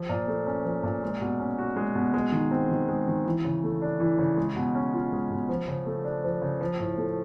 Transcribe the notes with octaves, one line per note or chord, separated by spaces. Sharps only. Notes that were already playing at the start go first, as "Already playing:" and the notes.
Already playing: F3
A#2
A3
C#4
F3
A#2
G#3
B2
C#4
F#4
G#3
B2
G#3
D#3
C4
D#3
G#3
D#3
E3
C#3
A3
D4
E3
C#3
G#3
B2
C#4
F4
G#3
B2
F3
C#3
A3
D4
F3
C#3
F3
A2
A3